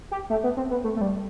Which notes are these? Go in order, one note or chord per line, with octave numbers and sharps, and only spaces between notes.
G4
A3
B3
C4
B3
A3
A3
G3